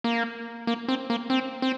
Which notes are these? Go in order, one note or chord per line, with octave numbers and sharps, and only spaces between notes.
A#3
A#3
C4
A#3
C4
C4